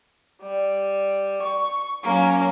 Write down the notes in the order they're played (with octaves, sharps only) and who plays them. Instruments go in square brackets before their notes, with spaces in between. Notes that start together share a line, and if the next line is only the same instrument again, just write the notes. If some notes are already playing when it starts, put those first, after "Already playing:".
[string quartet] G3
C#6
F#3 A#3 C#4